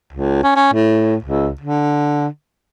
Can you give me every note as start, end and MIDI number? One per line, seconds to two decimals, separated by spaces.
0.13 0.42 37
0.43 0.53 61
0.56 0.70 61
0.73 1.16 45
1.24 1.52 37
1.61 2.27 50